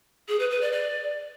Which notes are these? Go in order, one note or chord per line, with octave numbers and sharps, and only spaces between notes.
G#4
B4
B4
D5
D5